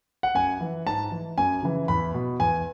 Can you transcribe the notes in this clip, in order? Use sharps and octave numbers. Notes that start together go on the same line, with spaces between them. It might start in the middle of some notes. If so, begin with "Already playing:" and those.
F#5
F#2 G#5
E3
G#2 A5
E3
F#2 G#5
C#3 E3
E2 B5
B2
E2 G#5